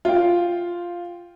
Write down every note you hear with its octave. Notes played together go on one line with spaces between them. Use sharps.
F4 G5